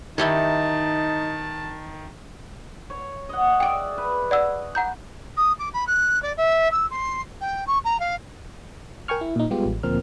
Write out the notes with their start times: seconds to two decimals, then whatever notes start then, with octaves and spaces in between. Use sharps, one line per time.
0.18 D#3 D#4 E4 G4 C#5 A5
2.90 C#5
3.29 D#5 F#5
3.60 G#4 D5 E5 G5 D7
3.98 B4
4.31 D5 F#5 E6
4.75 F#5 A#5 G6
5.37 D#6
5.58 D6
5.73 B5
5.87 F#6
6.22 D5
6.37 E5
6.71 E6
6.90 C6
7.40 G5
7.67 C#6
7.84 A#5
7.99 F5
9.08 A#4 G5 G#5 C#6 F6
9.21 E4
9.36 A#2 D#4
9.50 G3 G#3 B3 F4 G4
9.65 A1
9.83 D2 A#2 F3 C4 A#4 F6